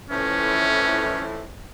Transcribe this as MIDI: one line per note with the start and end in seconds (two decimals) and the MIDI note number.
0.10 1.44 41
0.10 1.44 45
0.10 1.44 52
0.10 1.25 61